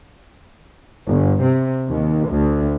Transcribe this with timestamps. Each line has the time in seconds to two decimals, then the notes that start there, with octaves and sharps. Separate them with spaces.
1.09 G1
1.43 C3
1.89 D#2
2.28 D2